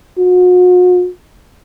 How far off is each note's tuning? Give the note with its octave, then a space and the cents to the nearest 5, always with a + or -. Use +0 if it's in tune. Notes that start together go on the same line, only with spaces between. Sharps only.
F#4 -40